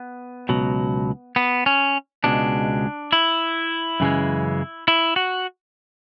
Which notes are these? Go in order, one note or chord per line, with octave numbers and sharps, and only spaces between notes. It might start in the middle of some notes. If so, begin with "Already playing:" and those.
Already playing: B3
C#2 B2 F#3
B3
C#4
C#2 B2 G#3 D4
E4
F#2 C#3 E3 G#3
E4
F#4